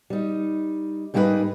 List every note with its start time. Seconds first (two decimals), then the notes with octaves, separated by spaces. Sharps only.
0.10 G3 D#4
1.14 G#2 G3 A#3 D#4 G4 B4